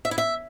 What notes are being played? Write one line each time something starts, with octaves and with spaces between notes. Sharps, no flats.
E5
E4
E5